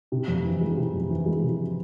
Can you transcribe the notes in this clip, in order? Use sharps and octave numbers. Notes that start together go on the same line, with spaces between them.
C3
F2
E3
G#3
C3
F2
E3
G#3
C3